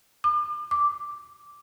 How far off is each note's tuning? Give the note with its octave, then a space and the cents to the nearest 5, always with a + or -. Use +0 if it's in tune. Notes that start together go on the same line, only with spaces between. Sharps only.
D6 +40
D6 -5